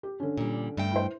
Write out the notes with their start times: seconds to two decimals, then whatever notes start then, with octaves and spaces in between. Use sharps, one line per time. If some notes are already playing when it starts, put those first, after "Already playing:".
0.03 G4
0.20 D3 C#4
0.37 A#2 G3
0.77 G2 A3 G5
0.92 E4 C5